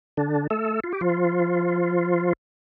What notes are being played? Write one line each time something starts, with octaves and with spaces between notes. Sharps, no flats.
D3 D4
A3 A4
F4
G4
F3 F4